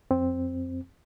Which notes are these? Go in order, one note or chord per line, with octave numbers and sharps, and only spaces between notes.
F2 C4